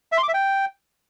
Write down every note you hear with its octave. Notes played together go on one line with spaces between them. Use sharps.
E5
C6
D6
E5
G5